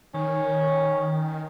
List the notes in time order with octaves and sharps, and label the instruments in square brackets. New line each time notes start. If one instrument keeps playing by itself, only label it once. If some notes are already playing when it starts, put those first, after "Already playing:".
[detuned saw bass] D#3 [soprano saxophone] C#4